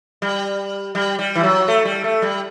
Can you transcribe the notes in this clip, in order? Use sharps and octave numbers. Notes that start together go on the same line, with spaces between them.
G3
G3
G3
E3
F#3
A3
G3
A3
G3